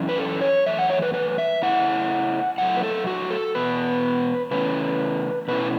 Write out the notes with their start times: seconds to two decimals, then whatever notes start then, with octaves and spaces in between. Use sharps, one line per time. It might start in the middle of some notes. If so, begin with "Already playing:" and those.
Already playing: F#2 E3 C#4 E4
0.09 B4
0.18 A4
0.41 C#5
0.66 F#2 E3 A3 E5
0.79 F#5
0.90 C#5
1.02 B4
1.14 B4
1.38 E5
1.62 C#3 A3 E4 F#5
2.58 A2 F#3 A3 F#5
2.77 B4
2.83 A4
3.07 F#4
3.31 A4
3.55 E2 B2 B3 B4
4.51 C#3 E3 A3 C#4 B4
5.48 B2 A3 C#4 E4 B4